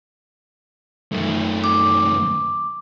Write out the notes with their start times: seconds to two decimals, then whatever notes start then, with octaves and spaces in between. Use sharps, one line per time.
1.12 F#2 A3
1.64 D6